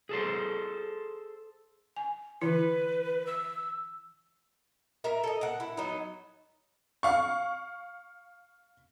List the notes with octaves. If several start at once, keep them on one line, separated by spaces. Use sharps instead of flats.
G#4 A4 C5
G#5
D3 E3 E4 B4
E6
A#4 E5 A#5
A4 D#5
A#4 F#5
E4
F#3 B3 D#4
F5 C#6